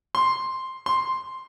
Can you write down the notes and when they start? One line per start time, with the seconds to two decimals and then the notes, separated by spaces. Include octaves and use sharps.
0.15 C6
0.86 C6